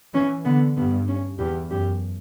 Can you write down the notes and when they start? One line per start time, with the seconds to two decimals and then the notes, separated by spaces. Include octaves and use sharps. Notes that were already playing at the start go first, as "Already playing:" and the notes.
0.14 E3 C#4
0.45 D3 B3
0.76 G2 B3
1.08 C#4
1.39 E2 G4
1.71 F#2 G4